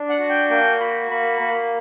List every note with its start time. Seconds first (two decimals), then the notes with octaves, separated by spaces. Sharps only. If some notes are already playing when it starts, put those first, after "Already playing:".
Already playing: D4
0.09 F#5
0.20 F#4
0.30 G5
0.50 A#3 G5
0.80 F#4 B5
1.11 A#3 B5
1.40 A#3